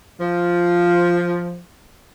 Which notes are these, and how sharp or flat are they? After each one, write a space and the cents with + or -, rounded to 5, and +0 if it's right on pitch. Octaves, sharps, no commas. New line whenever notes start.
F3 +0